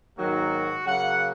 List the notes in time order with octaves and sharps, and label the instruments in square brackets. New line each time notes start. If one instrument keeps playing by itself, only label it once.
[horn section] G#2 D#3 F#3 A#3 F#4
C#3 F#3 A#3 F#5